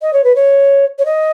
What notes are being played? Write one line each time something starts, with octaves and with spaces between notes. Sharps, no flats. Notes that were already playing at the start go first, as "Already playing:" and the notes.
D#5
C#5
B4
C#5
C#5
D#5